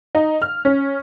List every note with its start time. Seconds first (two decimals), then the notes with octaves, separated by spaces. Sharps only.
0.15 D#4
0.42 F6
0.65 C#4